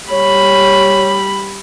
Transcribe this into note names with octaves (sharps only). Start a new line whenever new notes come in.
G3 C#5 B5